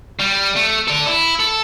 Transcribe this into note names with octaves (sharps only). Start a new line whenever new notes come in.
G3
A3
A4 D5
E4
A4